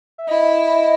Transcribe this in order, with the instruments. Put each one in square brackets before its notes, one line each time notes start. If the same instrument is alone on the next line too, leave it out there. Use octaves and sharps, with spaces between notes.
[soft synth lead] E5
[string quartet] E4 [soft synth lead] D#5